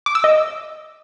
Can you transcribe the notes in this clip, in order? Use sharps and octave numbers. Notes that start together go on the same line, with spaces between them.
D6
E6
D#5